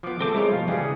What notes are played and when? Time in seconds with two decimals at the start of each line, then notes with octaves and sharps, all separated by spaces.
0.03 F3 B3 D6
0.21 A3 C4 G#4 A4 C5 D6
0.35 F3 G#3 E4 A#4 C#5
0.52 B2 F5
0.68 C#3 E3 G3 G#4